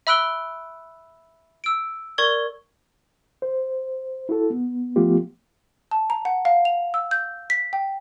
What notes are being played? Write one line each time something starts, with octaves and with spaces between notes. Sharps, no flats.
E5 B5 E6 F#6 D7 G7
E6 D7
A#4 D5 C#6 G#6 G7
C5
E4 F#4 A4
B3
F3 A3 B3 F4 G4
A5
A#5
F#5
F5
F7
E6
G6
B6
G5